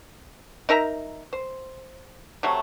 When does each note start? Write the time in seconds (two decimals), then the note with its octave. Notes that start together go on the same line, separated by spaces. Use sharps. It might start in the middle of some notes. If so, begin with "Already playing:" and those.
0.69 D#4 A#4 E5 A#5
1.33 C5
2.43 C3 F#3 A3